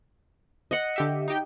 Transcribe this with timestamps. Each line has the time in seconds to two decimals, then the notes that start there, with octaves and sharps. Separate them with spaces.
0.71 D#5 F#5
0.96 D3 G4 E5
1.28 D#4 G4 G5